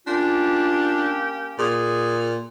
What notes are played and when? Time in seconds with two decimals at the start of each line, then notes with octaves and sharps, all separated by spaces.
0.07 A#3 C#4 D4 F4 G4
1.59 A#2 G#4